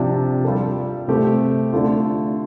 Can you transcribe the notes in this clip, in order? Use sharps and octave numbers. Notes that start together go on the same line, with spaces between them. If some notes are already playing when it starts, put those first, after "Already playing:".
Already playing: C3 F3 D4 G4
G3 F4 A4
C3 A3 C4 G4
D3 A3 F4